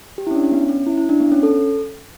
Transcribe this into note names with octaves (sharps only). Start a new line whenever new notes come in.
G4
E4
C#4
D4
C#4
B3
C#4
E4
E4
D4
B3
C#4
A4